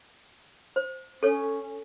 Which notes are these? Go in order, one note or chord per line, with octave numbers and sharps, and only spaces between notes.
C5
C#4 A4 C#5